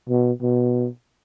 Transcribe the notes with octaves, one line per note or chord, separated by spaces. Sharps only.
B2
B2